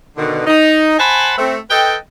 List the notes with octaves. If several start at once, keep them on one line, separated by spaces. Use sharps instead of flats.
B2 D3 D#3
D#4
C5 F#5 G#5 A5 B5
A3 C4
A4 B4 D#5 G5